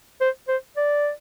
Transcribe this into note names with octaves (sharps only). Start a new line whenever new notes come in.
C5
C5
D5